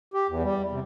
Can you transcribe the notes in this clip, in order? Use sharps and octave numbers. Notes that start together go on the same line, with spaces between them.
G4
E2
G3
C3